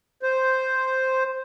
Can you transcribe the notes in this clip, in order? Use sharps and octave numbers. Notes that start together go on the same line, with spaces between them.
C5